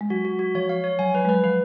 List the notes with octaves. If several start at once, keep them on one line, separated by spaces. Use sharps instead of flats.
G#3
F#3 F#4
F#4
F#4
F3 C#5
F5
C#5
F#3 G#5
F#3 B4
G#3
F#3 B4
F3 B4